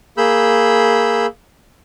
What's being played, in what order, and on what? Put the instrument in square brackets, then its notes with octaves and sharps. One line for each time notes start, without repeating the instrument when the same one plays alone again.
[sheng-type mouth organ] A#3 G#4 B5 E6 G6